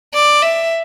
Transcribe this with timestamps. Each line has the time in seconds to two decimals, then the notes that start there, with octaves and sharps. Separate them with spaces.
0.14 D5
0.42 E5